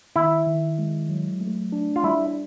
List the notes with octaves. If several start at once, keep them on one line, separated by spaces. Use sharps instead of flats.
D#3 E4
D#3
G#3
F#3
A3
D4
F4
G3 E4